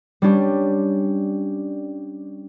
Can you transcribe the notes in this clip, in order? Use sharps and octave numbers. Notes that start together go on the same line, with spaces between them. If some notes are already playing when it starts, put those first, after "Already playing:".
G3 C#4 D4 G4